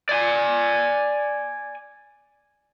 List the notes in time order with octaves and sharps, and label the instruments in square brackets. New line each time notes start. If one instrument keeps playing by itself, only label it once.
[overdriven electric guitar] D5 G#5